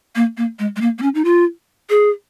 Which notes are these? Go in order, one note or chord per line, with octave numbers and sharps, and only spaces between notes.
A#3
A#3
G#3
G#3
A#3
A#3
C#4
D#4
F4
G#4